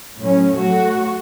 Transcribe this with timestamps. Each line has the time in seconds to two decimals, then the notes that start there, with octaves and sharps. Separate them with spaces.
0.18 A2 F#3 C#4
0.56 A2 F#3 A3 F#4